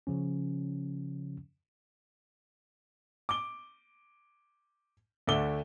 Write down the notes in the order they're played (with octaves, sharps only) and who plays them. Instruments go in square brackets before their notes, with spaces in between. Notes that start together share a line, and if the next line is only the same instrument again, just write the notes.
[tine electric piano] C#3 F3 C#4
[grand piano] D6 G7
D2 D3 A3 E5 D6 G7